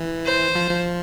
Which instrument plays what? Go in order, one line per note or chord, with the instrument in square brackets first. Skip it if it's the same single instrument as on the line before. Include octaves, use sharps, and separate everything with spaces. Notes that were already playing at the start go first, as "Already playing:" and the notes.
Already playing: [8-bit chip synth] E3
[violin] C5
[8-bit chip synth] F3
F3